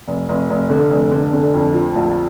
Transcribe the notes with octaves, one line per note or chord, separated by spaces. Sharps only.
F1
F1
F1
D3
F1
D3
D3
F2
F3
A#1